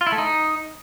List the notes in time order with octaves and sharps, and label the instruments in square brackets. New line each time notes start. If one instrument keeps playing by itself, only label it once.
[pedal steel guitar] F4
E4
A3
D#4